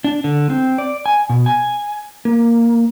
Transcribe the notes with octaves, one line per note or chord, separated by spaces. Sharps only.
D4
D3
C4
D5
G#5
B2
G#5
A#3